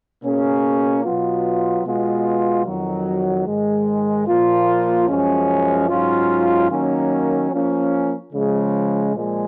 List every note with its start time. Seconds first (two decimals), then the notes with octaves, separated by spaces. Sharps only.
0.23 B2 A#3 C#4 G#4
1.03 B2 F#3 B3 F4
1.85 B2 G#3 B3 F4
2.66 F2 D#3 F#3
3.46 G#2 D#3 G#3
4.28 A#2 F3 A#3 F4
5.08 F#2 F3 G#3 C#4
5.89 G#2 F#3 C#4 F4
6.70 D#3 F#3 A#3 C#4
7.51 F3 A#3 C#4
8.32 C#3 F3 G#3
9.13 A#2 F3 G#3